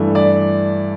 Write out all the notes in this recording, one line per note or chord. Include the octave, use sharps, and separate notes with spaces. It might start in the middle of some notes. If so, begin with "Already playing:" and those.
Already playing: G2 E3 A3
D5